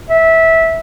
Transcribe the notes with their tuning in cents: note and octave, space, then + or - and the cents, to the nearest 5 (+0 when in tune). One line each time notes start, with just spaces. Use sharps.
E5 -15